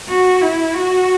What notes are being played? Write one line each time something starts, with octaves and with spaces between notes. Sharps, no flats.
F#4
E4
F#4